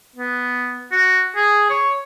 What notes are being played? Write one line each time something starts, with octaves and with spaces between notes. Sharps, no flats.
B3
F#4
G#4
C#5